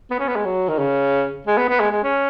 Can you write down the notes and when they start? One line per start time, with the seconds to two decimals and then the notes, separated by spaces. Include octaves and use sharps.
0.11 B3
0.19 C#4
0.28 B3
0.36 G#3
0.45 F#3
0.69 D#3
0.78 C#3
1.47 G#3
1.58 B3
1.69 B3
1.80 G#3
1.92 G#3
2.03 C#4